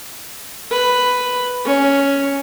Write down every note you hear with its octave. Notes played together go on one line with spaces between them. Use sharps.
B4
C#4